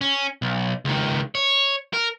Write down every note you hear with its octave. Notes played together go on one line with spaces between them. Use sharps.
C#4
B1
C#2 D#3
C#5
A#4